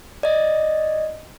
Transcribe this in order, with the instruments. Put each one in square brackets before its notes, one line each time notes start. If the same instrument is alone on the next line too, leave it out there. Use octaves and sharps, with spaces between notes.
[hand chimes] D5 D#5